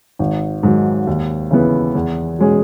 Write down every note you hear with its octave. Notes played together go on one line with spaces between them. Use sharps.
G#1
G#2 D#3 F#3
D#2
C#3 E3 B3
E2
B2 G#3 C#4 G#4